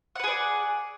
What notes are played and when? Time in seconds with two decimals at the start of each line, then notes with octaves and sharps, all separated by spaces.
0.16 F#5
0.20 B4
0.24 G#4
0.28 D5